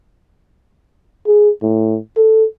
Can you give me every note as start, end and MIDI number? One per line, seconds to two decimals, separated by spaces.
1.27 1.50 68
1.62 1.98 45
2.17 2.45 69